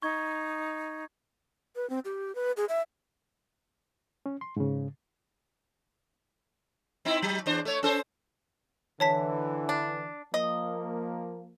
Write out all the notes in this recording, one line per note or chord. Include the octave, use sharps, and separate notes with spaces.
D#4 C#6 G#6
B4
C4
G4
B4
G#4
E5
C#4
C6
G#2 C#3
C4 D#4 E4
F#3
E2 D4 C5
A3 C#5
C#4 A4 C5
D3 E3 C#5 A5 B6
D4
F3 A#3 D#5